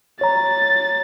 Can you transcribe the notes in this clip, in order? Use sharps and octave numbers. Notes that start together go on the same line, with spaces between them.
C#5 A#5 A6